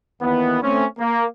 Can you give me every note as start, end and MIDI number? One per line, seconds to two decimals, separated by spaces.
0.21 0.58 39
0.21 0.58 51
0.21 0.58 52
0.21 0.58 59
0.62 0.85 57
0.62 0.85 60
0.62 0.85 61
0.99 1.25 58